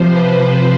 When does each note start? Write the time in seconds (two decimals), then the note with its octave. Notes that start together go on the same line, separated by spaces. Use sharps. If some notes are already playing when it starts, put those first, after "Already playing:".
Already playing: C3 F3 C5
0.09 B4